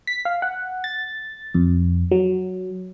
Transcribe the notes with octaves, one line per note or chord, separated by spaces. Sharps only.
B6
F5
F#5
A6
F2
F#3